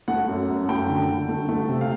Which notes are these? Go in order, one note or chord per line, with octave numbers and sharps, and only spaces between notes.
A3 F#5
F#2
F#2
A3 G5
D3
D3
A3
A3
C3
F5